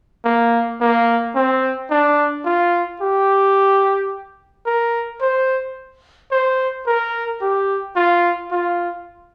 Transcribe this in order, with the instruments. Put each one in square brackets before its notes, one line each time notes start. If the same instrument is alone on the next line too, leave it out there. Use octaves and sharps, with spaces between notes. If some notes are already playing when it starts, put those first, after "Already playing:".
[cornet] A#3
A#3
C4
D4
F4
G4
A#4
C5
C5
A#4
G4
F4
F4